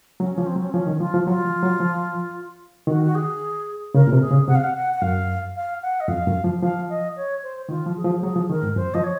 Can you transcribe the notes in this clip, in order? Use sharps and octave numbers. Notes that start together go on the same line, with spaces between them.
F#3 C#4
F3 C#4
C4
F#3
C#4
C4
F3 C#4
D#3
F3 F4
F3
F#3 F4
F3
F#3
F3
D#3 F#4
F#4
G#4
C#3 A#4
A#2
C3 A#4
G#4
C#3
C3 F#5
F5
F#5
F#5
F#5
F#2 F5
F5
F#5
D#5
F2 F5
F#2
F3
F3 F5
D#5
C#5
C5
D#3 F4
F3
G#4
F3
F#3 G#4
F3
D#3 A#4
G#2
F#2 C5
F3 D#5
C#5